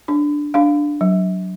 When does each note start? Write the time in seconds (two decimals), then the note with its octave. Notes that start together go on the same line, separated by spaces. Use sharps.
0.08 D4
0.54 D4 F5
1.01 F#3